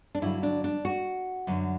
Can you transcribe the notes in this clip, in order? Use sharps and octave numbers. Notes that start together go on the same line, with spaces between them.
D4
G2 D3 F#3 E4
D4
D4
F#4
F#2 D3 F#3